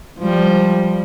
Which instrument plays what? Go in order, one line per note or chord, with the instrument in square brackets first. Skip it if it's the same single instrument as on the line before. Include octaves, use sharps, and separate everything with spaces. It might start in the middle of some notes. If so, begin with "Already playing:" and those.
[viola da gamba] F3 G3